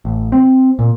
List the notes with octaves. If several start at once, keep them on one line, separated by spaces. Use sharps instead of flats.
A1
C4
A#2